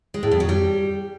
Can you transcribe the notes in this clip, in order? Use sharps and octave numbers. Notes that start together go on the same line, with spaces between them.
G#3
A2
F2
F#3
G3